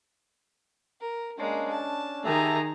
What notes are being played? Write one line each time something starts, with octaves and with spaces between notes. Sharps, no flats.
A#4
G#3 A#3 C#4 D4
A5
D#3 G4 G#4 E5 A5 A#5